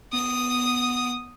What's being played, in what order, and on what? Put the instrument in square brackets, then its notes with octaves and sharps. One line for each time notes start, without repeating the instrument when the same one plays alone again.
[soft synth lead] B3 [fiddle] D#6